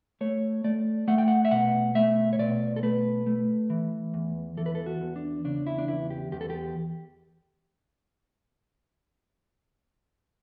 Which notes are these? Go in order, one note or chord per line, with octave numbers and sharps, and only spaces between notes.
A3 C#5
A3 D5
A3 F#5
G5
F#5
E5
B2 F#5
A3 E5
C#5
B2 D5
A4
A3 B4
A3
E3
E2
E3 A4
B4
A4
F#4
E2
D4
C#3 D4
E4
D4
E2 E4
G4
E2 G4
A4
G4